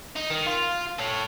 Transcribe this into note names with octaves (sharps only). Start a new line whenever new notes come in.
D#4
D#3
F4
A4 C#5